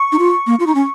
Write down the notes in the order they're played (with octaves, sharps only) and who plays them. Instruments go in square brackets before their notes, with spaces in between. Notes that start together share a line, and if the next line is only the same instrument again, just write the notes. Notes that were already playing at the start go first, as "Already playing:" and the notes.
Already playing: [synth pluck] C#6
[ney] D#4
F4
A#3
F4
D#4
C#4